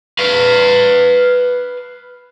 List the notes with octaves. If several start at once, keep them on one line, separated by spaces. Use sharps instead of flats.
B4 F5